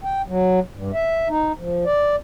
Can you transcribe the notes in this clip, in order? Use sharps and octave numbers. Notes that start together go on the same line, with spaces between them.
G5
F#3
G2
E5
D#4
F3
D5